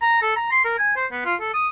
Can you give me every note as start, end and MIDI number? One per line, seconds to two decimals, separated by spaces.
0.01 0.19 82
0.21 0.33 69
0.36 0.47 82
0.51 0.63 84
0.64 0.76 70
0.78 0.93 80
0.96 1.06 72
1.11 1.21 59
1.25 1.35 65
1.40 1.52 69
1.54 1.68 87